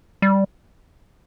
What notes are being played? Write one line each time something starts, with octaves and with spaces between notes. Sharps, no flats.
G3